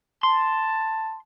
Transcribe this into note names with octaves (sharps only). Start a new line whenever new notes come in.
A5 C6